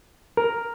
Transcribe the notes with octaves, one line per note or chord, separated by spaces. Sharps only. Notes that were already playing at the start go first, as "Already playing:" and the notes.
A#4